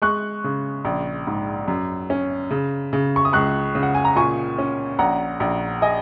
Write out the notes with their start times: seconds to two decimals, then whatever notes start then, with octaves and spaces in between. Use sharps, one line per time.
0.02 G#3 C#6 F#6
0.44 C#3
0.85 A#1
1.27 G#2
1.68 F#2
2.10 C#4
2.51 C#3
2.93 C#3
3.16 C#6
3.25 D#6
3.33 C#2 C#6 F#6
3.75 C#3
3.83 F#5
3.94 G#5
4.05 A#5
4.16 A#2 G#5 C#6
4.58 C#4
4.99 A#1 F#5 A#5
5.40 A#1
5.82 D#5 G#5